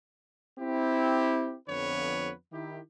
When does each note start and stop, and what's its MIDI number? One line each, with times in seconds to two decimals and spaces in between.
0.59 1.55 60
0.59 1.55 64
0.59 1.55 67
1.68 2.31 41
1.68 2.31 50
1.68 2.31 53
1.68 2.31 59
1.68 2.31 71
1.68 2.31 73
2.53 2.78 51
2.53 2.78 64
2.53 2.78 67